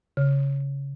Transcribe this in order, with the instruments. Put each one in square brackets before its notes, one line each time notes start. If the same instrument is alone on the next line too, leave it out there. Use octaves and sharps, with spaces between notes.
[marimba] C#3